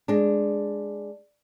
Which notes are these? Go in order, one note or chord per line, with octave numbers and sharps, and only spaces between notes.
G#3 D4